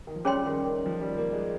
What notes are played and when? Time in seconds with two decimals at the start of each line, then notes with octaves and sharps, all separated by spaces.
0.07 D#3
0.16 F3
0.25 G3 C#4 G#4 C#5 G5 C6
0.46 D#3
0.66 D#3
0.86 F3
1.01 G3
1.17 A#3
1.33 G#3